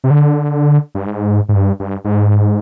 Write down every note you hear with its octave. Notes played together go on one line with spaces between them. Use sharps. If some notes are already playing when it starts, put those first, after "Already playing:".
C3
D3
G2
G#2
G#2
G2
G2
G#2